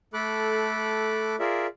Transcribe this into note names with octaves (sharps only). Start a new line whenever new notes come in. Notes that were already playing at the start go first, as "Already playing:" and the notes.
A3 A4 B5 D6 F#6
F4 G#4 A#4 D5 E5